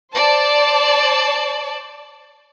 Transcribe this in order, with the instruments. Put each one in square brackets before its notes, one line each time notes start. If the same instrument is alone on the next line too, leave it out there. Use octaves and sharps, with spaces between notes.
[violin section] C5 D5 A5